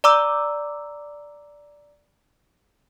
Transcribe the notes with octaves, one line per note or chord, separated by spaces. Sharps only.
D5 A#5 D6 E6